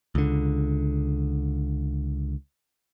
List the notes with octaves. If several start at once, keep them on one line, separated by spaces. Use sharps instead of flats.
C#2 D3